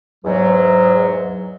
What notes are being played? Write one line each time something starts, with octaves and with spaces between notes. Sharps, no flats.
E2 G#2 F#3